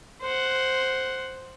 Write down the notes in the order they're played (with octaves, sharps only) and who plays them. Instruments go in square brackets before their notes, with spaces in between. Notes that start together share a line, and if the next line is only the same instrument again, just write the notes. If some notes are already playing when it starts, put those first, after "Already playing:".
[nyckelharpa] C5 F#5